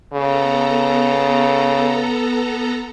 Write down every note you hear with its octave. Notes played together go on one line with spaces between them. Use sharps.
C#3 B3 A4 A#5